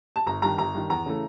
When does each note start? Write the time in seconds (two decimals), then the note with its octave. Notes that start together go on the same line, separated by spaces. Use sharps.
0.16 A5
0.26 G1 A#5
0.42 G2 D#3 A#5
0.58 G1 A#5
0.74 G2 D#3
0.90 E2 A#5
1.06 C#3 E3 A3